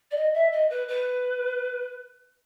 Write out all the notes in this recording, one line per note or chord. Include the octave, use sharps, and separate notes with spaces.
D5
D#5
E5
D#5
B4
B4